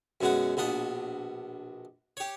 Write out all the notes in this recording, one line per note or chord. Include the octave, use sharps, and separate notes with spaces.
F#2 B2 G#3 F#4
A#1 B2 D4 D#5
G4 C#5